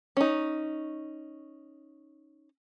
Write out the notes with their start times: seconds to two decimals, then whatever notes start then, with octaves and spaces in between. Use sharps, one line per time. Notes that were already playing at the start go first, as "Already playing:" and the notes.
0.17 C#4 D#4